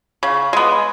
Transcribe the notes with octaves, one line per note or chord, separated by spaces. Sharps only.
C#3
G#3 B3